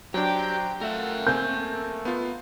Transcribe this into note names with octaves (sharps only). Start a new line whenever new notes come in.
F#3 D4 G4 C5 G5 A#5
A3 F4 A#4 E5 F#5 G5
A3 A#3 C4 G#5 G6
B3 F4